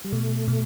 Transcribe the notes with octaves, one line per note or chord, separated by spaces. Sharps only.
G3
B2 A3
B2